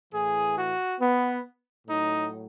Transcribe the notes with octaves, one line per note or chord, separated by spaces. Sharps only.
A2 E3 G#4
F#4
B3
A2 F#3 D#4